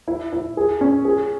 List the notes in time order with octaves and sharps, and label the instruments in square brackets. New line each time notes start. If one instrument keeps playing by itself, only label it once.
[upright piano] E4
E4
G#4
C#4
G#4